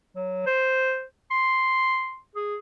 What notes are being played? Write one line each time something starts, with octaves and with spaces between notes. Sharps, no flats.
F#3
C5
C6
G#4